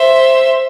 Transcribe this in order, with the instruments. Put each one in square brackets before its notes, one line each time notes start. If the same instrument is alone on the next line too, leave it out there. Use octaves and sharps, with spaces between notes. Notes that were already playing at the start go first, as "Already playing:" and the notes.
Already playing: [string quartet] C5 E5